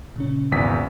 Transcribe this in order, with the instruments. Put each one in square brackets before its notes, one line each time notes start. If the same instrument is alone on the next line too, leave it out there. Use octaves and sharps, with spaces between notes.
[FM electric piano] A#2 C#3 C#4
[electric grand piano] G#1 E2 B6